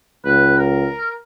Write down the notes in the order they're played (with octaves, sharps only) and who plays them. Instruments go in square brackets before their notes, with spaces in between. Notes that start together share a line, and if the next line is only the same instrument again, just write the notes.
[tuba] C#2 [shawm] B4
[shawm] A#4